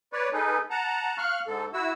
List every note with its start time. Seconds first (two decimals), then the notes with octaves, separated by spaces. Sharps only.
0.13 B4 C#5 D5
0.33 D#4 G#4 A4 B4
0.70 F#5 A5 A#5
1.18 F5 C#6 F6 F#6
1.46 G#2 D3 A4
1.73 E4 F#4 E6